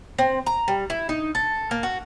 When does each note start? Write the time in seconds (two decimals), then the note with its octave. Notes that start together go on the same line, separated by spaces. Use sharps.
0.18 C4
0.46 A#5
0.68 G3
0.90 E4
1.09 D#4
1.35 A4
1.71 A#3
1.83 F#4